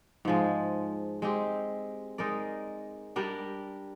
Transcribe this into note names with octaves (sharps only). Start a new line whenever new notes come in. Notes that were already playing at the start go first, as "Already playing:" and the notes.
G#2 F3 G#3
G#3 C4 G4
G#3 D#4 A#4 D5
G3 D4 G4 A#4